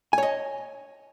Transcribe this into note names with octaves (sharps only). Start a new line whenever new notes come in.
C#5 D#5 G#5